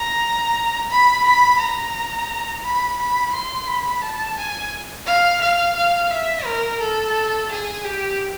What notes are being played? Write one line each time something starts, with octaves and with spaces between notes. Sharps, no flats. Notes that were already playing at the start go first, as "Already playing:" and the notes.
Already playing: A#5
B5
B5
A#5
B5
B5
C6
B5
A5
G#5
F5
F5
F5
E5
A#4
A4
G#4
G4